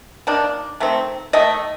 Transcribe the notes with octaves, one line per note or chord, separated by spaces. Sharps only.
D#3 A#3 D4
D#3 A3 C4
D#3 A3 D#5